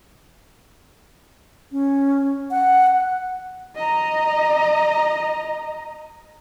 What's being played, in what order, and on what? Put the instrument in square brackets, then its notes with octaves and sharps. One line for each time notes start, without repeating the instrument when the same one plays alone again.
[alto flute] C#4
F#5
[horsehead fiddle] D#5 A#5